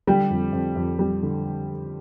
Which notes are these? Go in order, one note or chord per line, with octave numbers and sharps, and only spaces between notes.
D3 G3 G4
F2
F2
F2
G3
D3